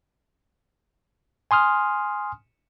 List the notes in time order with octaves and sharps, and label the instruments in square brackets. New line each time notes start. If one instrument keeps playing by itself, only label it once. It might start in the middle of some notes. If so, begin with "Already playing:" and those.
[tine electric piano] G#5 C6 D#6 F6